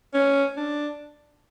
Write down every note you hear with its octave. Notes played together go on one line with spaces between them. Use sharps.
C#4
D4